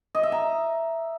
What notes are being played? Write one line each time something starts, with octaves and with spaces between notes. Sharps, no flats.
D#5
E5
A#5